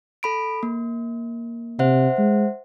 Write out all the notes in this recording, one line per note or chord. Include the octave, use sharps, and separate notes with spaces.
A4 B5 D7
A#3
C3 C5 E5 F#5
G#3